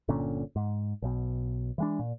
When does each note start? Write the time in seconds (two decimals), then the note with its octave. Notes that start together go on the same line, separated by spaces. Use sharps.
0.08 G1 A#2 D3 C#4
0.56 G#2
1.02 B1 B2
1.78 E3 G#3 D4
1.99 A#2